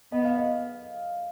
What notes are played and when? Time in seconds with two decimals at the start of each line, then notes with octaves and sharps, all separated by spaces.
0.12 B3 D#5
0.25 F5
0.38 D#5